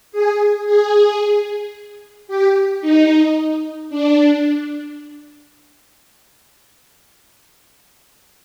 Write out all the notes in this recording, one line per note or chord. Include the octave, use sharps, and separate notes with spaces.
G#4
G#4
G4
D#4
D4